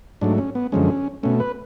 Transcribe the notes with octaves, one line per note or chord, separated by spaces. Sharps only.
G#2 F#3 A3 D4
C#4
B3
F#2 D3 F3 G#3 C#4
B2 A3 C#4
B4